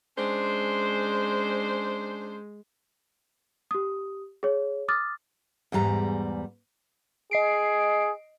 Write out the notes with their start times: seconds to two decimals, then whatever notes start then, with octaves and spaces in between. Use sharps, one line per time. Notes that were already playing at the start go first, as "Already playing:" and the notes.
0.18 G#3 C#4 D4 C5
3.71 G4 D#6
4.43 G#4 C#5
4.88 D6 D#6 F6 A6
5.72 E2 G#2 G3 A#5
7.31 G#4 D#5 C7 D7